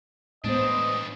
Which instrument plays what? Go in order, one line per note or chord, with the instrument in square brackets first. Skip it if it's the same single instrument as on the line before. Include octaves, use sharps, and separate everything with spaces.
[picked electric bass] A2 G#3 [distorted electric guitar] E3 D4 [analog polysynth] B3 C5 [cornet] D#5